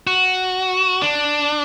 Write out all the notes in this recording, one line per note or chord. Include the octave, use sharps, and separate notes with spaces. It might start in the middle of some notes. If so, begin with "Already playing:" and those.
F#4
D4